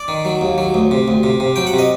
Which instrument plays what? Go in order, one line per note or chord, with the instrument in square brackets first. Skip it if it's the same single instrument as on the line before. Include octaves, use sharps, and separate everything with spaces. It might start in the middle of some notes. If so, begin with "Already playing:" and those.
Already playing: [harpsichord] D5
D#3
F#3
D#2
F#3
D2
C3
D2
C3
C3
F#3 G5
F#5
C3
D#5